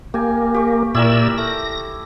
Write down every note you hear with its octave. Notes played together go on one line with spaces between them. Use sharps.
A#3 G4 G#5
G4 C#6
A#2 E4 G4 A#4 D5 E6
A3 A#6